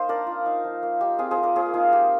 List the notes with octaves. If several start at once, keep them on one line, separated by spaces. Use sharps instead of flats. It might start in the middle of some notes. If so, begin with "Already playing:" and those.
Already playing: A#3 D#4 C5
D4 A#4 D5
F4
D#4
F3
A#3
D#4 G4
C4 F4 G#4
G#4 C5
F3
A#4 D5
A#3 G#4 C5
D#4 F4 G#4
D#4 G4